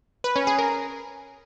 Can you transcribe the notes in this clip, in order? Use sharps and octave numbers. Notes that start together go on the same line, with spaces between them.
B4
C#4
G#4
A#4